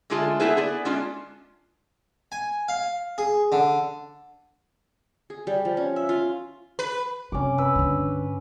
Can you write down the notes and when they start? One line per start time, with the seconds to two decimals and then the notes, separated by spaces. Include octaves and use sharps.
0.10 D3 G#3 A3 F4 G#4 A4
0.40 A3 B3 C4 E4 G#4 B4
0.57 B3 G#4 D5
0.85 G#3 C#4 D4 F4
2.32 G#5
2.68 F5
3.18 G#4
3.52 D3
5.30 G#4
5.47 G3
5.65 F3
5.77 C#4
5.96 E5
6.09 F4
6.79 B4
7.32 F#2 C3 C#4 D6
7.58 B4 E6
7.76 G2 D3